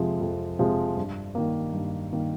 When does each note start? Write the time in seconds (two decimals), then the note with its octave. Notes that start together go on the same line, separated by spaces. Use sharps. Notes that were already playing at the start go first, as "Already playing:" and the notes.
Already playing: F2 C3 F3 G#3
0.21 F2
0.59 C3 F3 G#3
0.97 G2
1.35 D#3 A#3
1.73 G2
2.13 D#3 A#3